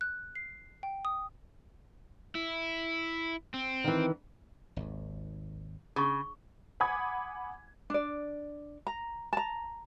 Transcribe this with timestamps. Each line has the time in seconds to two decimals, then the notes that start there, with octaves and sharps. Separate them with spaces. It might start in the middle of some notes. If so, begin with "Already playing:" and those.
0.01 F#6
0.35 C7
0.83 G5
1.05 D#6
2.35 E4
3.54 C4
3.84 D#3 E3
4.76 G#1 D#2
5.96 C#3 G#4 C#6
6.80 F#5 G#5 B5 D6 D#6 G#6
7.90 D4 D5
8.87 A#5
9.33 A5 A#5